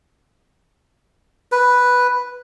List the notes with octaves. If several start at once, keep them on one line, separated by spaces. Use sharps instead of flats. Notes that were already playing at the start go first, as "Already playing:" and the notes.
B4